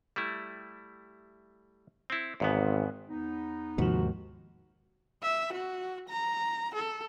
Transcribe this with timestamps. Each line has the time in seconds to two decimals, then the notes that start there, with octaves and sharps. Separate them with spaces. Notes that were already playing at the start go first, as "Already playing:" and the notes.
0.16 G3 A3 E4
2.10 C4 E4
2.40 G#1 E2 G#2 B3
3.10 E2 B3 D#4
3.78 D#2 G#2 C3 F3 F#4
5.23 E5
5.52 F#4
6.09 A#5
6.75 A4